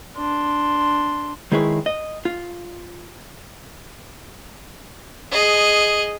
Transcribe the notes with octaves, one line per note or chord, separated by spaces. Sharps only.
D4 C6
D#3 G#3 E4 G#4 B4 C#5
D#5
F4
G#4 D#5